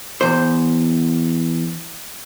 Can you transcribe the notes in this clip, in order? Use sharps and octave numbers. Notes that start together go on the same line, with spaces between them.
E2 C5